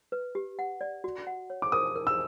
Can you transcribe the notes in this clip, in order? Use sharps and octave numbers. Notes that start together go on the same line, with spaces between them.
B4
G4
F#5
D5
F#4
F#5
C#5
D6
A#4 D#6
A#4
E6